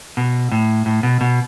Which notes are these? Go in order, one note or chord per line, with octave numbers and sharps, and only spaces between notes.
B2
A2
A2
B2
B2